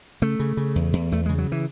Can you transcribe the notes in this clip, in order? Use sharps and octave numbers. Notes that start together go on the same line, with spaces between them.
C#3 A3
C#3
C#3
E2
E2
E2 A3
C#3 G#3
F#3
E3